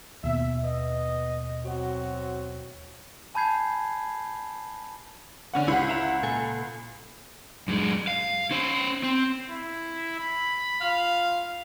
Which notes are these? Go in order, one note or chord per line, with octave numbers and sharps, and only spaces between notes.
D#2 B2 E5
B3 D#5
F#3 C4 F#4
G#5 A5 B5 G6 G#6 C7
D3 C#4 F#5
C#2 E4 G4 F#5
E4 E5 A#5
A#2 A4 G#5
F#2 G#3
F5
C#4 C5
C4
E4
B5
F4 F5